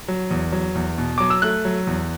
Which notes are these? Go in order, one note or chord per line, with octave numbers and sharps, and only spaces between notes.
F#3
E2
F#3
E2
B2
F#3 D6
E6
A3 F#6
F#3
E2